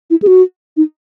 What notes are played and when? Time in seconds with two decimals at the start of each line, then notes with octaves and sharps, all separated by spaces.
0.10 E4
0.22 G#4
0.27 F#4
0.77 D#4